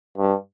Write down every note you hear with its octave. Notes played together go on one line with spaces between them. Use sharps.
G2